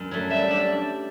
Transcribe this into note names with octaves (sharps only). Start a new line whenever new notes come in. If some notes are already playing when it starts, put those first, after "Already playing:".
Already playing: F#2
F#3 A3
G3 E5
D4 G4 D5